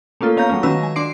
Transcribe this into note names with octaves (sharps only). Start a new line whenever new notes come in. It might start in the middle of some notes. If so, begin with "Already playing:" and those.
A3 A#3 C#4 F4 A4
B3 C#4 F5 A#5 G6
F#3 G#3 A3 C#4
D#3 C#4 F#4 B4 E6 A#6
G#5
D4 C6 D6 C7 D7